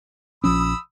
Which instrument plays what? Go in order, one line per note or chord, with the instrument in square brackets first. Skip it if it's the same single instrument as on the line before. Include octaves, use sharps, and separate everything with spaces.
[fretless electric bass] A#1 F3 C#4 [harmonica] B5 D#6 E6